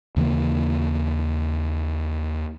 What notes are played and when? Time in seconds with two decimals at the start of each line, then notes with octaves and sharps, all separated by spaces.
0.16 D#2 C#3 E3 A#3